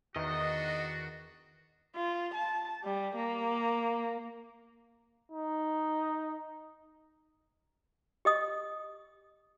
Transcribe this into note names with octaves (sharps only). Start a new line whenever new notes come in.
E2 D#3 D4 F#4 D#5
F4
A5
G3
A#3
D#4
G4 D#5 D#6